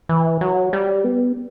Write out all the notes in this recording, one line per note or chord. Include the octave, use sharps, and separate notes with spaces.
E3
F#3
G3
B3